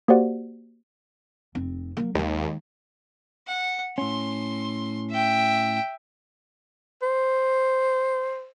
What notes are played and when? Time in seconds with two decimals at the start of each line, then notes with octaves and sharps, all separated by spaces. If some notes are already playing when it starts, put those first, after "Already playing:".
0.08 A#3 F#4 G4 C5 D5 F#5
1.55 F1 C4
1.97 F#3 A#3
2.15 D#2 D#3 G#3
3.47 F#5
3.98 A2 C#4 C6
5.11 E5 G5
7.02 C5